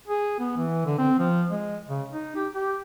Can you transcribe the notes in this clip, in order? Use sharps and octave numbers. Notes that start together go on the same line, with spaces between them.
G#4
B3
E3
D3
C4
F3
G#3
C#3
D#4
G4
G4